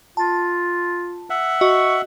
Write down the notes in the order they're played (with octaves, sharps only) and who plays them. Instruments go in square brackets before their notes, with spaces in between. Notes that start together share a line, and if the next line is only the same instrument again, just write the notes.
[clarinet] F4 [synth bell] A5
[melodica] E5 F#5
[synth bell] F#4 D#5 [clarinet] C#6